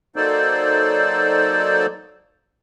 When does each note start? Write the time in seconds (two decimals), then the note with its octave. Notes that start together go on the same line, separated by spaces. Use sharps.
0.16 F#3 A#3 D#4 A4 C5 D5